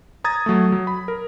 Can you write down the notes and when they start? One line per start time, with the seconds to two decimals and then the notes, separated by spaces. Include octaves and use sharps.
0.24 A#5 D#6 G#6 A6
0.46 F#3 A3
0.72 F#3
0.87 B5
1.08 A#4